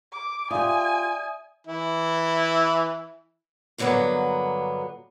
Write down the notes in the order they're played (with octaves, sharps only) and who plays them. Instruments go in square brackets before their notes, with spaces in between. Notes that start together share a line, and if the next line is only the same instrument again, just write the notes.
[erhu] D6
[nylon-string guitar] F4 G4 [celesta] D5 E5 D#6 [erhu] G#5
[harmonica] E3 E4
[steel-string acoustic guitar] G2 D3 F#3 A#3 B3